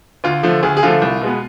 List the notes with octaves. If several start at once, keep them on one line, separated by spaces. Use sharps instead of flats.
D2 F4
D3 F3 A3
D2 G#4
G#4
D3 F3 A3 F4
C2
B2 G#3 B3